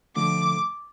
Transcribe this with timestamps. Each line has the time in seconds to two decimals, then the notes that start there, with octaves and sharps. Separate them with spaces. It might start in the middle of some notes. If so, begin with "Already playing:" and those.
0.16 D3 F3 A3 D6